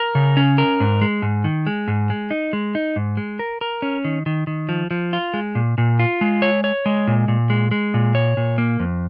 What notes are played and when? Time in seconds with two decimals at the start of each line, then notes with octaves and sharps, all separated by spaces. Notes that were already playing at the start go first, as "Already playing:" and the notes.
Already playing: A#4
0.15 C#3
0.37 C#4
0.58 A#4
0.80 G#2
1.01 G#3
1.22 G#2
1.44 D#3
1.67 G#3
1.88 G#2
2.10 G#3
2.31 D#4
2.53 G#3
2.75 D#4
2.96 G#2
3.17 G#3
3.39 A#4
3.61 A#4
3.82 C#4
4.05 D#3
4.26 D#3
4.47 D#3
4.69 F3
4.91 F3
5.13 F4
5.34 G#3
5.55 A#2
5.78 A#2
5.99 F4
6.21 G#3
6.42 C#5
6.64 C#5
6.86 G#3
7.07 A#2
7.28 A#2
7.50 G#3
7.71 G#3
7.94 A#2
8.15 C#5
8.37 A#2
8.58 A#3
8.80 F2